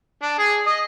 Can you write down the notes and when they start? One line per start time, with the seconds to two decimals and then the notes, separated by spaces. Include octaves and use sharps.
0.22 D4
0.38 G#4
0.66 D#5